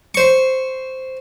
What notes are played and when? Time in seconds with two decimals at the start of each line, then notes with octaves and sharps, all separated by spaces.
0.15 C5 C#6